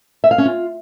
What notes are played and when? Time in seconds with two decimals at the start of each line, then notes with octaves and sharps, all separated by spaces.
0.24 E5
0.31 F5
0.38 C#4
0.45 F4